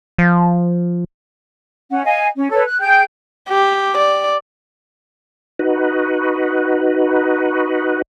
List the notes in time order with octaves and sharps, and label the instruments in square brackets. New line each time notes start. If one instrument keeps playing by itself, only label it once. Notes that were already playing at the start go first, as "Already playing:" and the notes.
[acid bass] F3
[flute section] C#4 F#5
D#5 F5 G#5
C#4
A4 B4 C#5
F#6
G#4 G5 G6
[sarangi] G4
D5
[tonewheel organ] D#4 F#4 B4